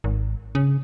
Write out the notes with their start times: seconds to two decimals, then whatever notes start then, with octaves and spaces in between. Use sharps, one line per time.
0.04 G#1
0.55 C#3